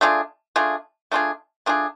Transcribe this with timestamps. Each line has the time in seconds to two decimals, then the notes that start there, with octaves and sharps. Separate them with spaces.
0.01 A3 D4 F4 G#4
0.56 A3 D4 F4 G#4
1.11 A3 D4 F4 G#4
1.66 A3 D4 F4 G#4